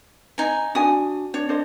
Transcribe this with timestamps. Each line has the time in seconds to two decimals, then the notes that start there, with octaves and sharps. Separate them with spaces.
0.38 D#4 G#5
0.75 D4 F#4 G#5 D#6
1.34 D4 C#5
1.49 D4 C5 D#5